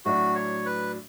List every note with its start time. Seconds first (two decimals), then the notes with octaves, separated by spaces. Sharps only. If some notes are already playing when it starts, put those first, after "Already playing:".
0.05 A2 F#3 A3 D4 F#4
0.35 C#5
0.66 B4